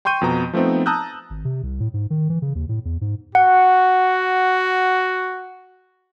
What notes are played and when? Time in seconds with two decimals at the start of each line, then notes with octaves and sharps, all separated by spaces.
0.05 G5 C6 C#6 G6 D#7
0.21 F2 B2 A#5
0.53 F3 A3 B3 C4 D#4
0.86 A5 A#5 D#6 E6 F#6 G6
1.30 G#1
1.45 C3
1.63 C2
1.80 A2
1.94 G#2
2.10 D#3
2.30 E3
2.42 C#3
2.55 D#2
2.69 A2
2.85 E2
3.01 G#2
3.35 F#4 F#5